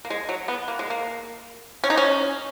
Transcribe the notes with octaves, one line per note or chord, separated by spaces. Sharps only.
A#3
G#3
F#3
B3
A#3
G#3
A#3
C#4
D#4
C#4